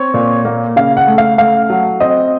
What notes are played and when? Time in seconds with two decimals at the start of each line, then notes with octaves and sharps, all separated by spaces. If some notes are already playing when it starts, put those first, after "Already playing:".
Already playing: C4 C#5
0.14 A#2
0.45 A#3
0.76 C#3 F5
0.97 F#5
1.07 A3
1.18 F5
1.38 A3 F5
1.70 F#3
2.00 C4 D#5